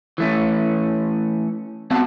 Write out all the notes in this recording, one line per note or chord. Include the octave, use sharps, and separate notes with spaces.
E3 A3 C#4
B3 C4 F#4 F5 A5